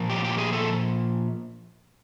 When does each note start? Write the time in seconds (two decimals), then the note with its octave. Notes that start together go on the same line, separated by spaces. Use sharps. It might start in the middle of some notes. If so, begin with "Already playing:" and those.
Already playing: A#2 F3 A#3
0.09 G4
0.25 G4
0.38 G#4
0.53 A4